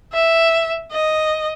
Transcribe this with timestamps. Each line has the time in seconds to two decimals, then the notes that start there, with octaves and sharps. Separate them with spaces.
0.13 E5
0.92 D#5